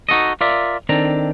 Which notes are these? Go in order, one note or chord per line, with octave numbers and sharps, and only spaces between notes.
D#4 F#4 A4 D#5
F4 A#4 D5 E5
D#3 C4 D4 A4 A#5